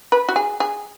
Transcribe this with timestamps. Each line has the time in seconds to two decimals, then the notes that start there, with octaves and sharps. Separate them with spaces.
0.12 B4
0.29 F#4
0.36 G#4
0.60 G#4